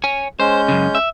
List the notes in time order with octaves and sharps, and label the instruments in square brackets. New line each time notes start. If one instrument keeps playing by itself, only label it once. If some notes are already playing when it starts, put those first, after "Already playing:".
[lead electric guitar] C#5 G#5
[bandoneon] G#3 C#4 G6 [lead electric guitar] C5
[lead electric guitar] F#2 C#3
E5